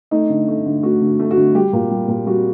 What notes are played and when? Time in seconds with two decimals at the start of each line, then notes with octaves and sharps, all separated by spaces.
0.11 A3 D#4
0.30 D3
0.48 A3
0.66 D3
0.83 A3 F#4
1.02 D3
1.19 A3
1.31 F#4
1.37 D3
1.55 G3 G4
1.73 A#2
1.91 G3
2.08 A#2
2.26 G3 F#4